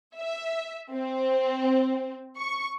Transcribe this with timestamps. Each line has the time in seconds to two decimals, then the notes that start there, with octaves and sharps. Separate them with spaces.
0.17 E5
0.91 C4
2.38 C#6